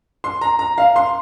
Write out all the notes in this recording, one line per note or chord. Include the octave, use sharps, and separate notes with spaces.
C6
A#5
A#5
F5
C6